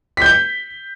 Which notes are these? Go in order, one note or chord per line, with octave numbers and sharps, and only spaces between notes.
G6 B6 G7